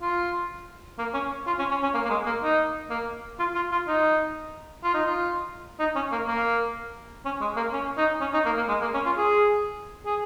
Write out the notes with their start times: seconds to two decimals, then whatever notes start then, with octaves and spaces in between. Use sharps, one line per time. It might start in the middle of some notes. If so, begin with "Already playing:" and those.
0.02 F4
0.99 A#3
1.14 C#4
1.47 F4
1.59 C#4
1.71 C#4
1.83 C#4
1.94 A#3
2.05 A#3
2.10 G#3
2.26 A#3
2.43 D#4
2.90 A#3
3.39 F4
3.55 F4
3.72 F4
3.88 D#4
4.84 F4
4.94 D#4
5.06 F4
5.79 D#4
5.96 C#4
6.12 A#3
6.28 A#3
7.25 C#4
7.41 G#3
7.57 A#3
7.73 C#4
7.97 D#4
8.21 C#4
8.34 D#4
8.46 A#3
8.57 A#3
8.69 G#3
8.82 A#3
8.94 C#4
9.06 F4
9.17 G#4
10.06 G#4